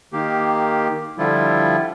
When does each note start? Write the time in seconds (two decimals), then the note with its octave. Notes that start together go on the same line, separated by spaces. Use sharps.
0.13 D#3 A#3 G4
1.18 D3 F3 G3 E4 F4